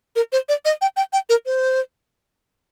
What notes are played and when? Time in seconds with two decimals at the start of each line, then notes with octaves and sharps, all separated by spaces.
0.16 A#4
0.32 C5
0.49 D5
0.65 D#5
0.81 G5
0.97 G5
1.13 G5
1.29 A#4
1.46 C5